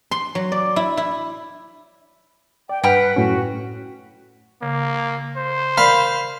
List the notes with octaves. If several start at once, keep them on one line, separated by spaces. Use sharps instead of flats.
C6
F#3
D5
E4
E4
D5 G5
G2 B4 F#5 G5 B5 F6
F#2 A2 C#4 F#4
C#3 A#3
C5
A#4 D5 F5 B5